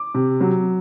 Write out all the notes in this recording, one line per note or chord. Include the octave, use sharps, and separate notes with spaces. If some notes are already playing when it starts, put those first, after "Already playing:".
Already playing: D6
C3
F#3